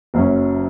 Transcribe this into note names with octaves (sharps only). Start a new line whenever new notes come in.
F#1 F#2 F#3 C#4